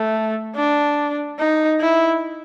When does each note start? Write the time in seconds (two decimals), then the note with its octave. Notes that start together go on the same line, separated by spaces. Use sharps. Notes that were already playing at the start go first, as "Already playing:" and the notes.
Already playing: A3
0.56 D4
1.39 D#4
1.80 E4